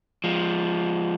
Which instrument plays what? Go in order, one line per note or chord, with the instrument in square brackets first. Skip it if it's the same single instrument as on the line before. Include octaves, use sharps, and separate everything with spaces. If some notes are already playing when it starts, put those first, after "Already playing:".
[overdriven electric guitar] F3 G#3